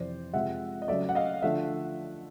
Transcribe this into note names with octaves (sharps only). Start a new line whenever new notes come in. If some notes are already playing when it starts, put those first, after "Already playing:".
Already playing: F2 C3 E3 C5 D5
C3 F3 G#3 E5 F#5
D#5
C#3 F#3 A3 D5 E5
F#5
D#5 F5
D3 F3 A3 E5 F#5